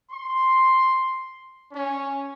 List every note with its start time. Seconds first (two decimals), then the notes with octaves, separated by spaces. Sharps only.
0.11 C6
1.72 C#4